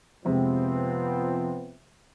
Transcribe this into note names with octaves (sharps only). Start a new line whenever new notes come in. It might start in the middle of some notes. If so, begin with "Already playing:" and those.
F2 C3 F3 G#3 B3 C4